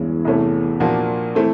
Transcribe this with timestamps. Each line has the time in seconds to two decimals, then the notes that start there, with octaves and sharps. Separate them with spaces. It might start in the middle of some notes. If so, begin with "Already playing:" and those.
Already playing: E2 G2 E3 G#3 C#4
0.25 C2 C3 E3 A3 C#4
0.80 A#2 F3 A#3 D4 F#4
1.35 E3 A3 C4